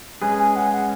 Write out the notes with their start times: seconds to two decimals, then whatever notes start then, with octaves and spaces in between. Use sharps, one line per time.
0.22 G#3 C#4 G#4 B4 G#5
0.38 G#5
0.56 F#5
0.72 F#5